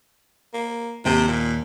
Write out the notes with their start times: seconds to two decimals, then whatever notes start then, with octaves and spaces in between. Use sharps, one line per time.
0.54 A#3
1.05 D#2 C3 G5
1.28 A#2